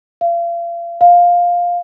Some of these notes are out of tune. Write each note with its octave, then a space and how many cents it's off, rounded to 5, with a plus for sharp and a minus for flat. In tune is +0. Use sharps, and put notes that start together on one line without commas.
F5 -40
F5 +10